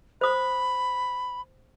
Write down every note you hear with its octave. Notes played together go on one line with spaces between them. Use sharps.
C5 B5 D#6